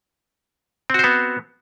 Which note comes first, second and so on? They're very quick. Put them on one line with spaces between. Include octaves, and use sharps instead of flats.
C4 F#4 C5 B3